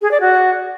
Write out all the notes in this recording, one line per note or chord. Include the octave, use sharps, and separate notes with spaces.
G#4
D5
F#4